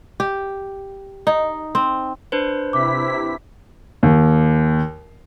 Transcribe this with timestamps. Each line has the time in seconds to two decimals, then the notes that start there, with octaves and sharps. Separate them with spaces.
0.20 G4
1.27 D#4
1.75 C4
2.32 D4 B4 C5
2.73 C3 E4 D6 B6
4.03 D#2